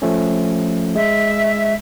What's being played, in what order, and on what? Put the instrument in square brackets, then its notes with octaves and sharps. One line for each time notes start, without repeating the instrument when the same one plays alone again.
[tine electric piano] F3 A3 C#4
[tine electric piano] G#3 [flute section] E5